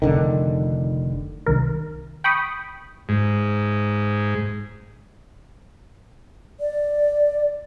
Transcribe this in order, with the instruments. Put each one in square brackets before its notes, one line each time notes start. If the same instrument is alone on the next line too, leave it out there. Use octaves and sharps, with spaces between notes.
[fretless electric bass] F1 D3 D#3
[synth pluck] C2 D#3 A#4
G5 B5 C#6 D#6
[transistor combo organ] G#2
[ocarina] D5